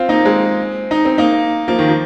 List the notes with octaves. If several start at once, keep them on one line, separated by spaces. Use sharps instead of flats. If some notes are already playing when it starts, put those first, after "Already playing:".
Already playing: C4 F4
A#3 D#4
G#3 C4
D#4
C4
A#3 D#4
F3 A#3
D#3
F3